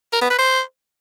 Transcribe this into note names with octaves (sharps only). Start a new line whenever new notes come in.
A#4
B3
B4
C5